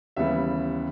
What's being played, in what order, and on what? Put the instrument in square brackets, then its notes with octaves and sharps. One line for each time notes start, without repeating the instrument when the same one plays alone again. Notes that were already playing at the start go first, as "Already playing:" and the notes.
[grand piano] D#2 C#3 E3 G3 B3 E5